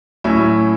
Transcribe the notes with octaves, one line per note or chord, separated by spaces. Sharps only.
A2 F#3 A3 C#4 E4